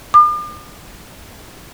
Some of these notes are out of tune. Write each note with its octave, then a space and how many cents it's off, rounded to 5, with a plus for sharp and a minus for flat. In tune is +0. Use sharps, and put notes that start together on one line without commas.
D6 +45